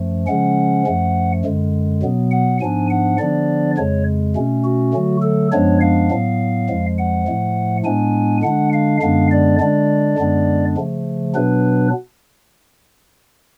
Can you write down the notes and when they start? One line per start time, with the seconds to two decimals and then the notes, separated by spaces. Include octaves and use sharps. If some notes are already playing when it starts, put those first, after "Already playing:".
Already playing: F#2 F3 A3
0.27 C#3 F3 G#3 C#4 F#5
0.87 F#2 F3 A3
1.44 F#2 D3 G#3
2.02 B2 F#3 B3
2.31 F#5
2.61 G#2 F3 B3 D4 G#5
2.90 F#5
3.18 D3 F3 B3 D4 D5
3.77 F2 C#3 G#3 C#5
4.35 B2 A3 C#4
4.64 F#4
4.93 D3 F#3 A3
5.22 A4
5.52 F#2 F3 G#3 B3 D4 C#5
5.81 F5
6.11 A2 F#3 B3
6.69 F2 F3 G#3
6.98 F#5
7.27 A2 F3 A3
7.85 A2 G#3 B3 D4 G#5
8.43 D3 G#3 D4 F#5
8.73 F5
9.01 F#2 D3 G#3 B3 D4 F5
9.31 D5
9.60 D3 G#3 D4 D5
10.18 F#2 D3 G#3 B3 D4
10.77 C#3 F3 A3
11.35 B2 F#3 B3 D4 B4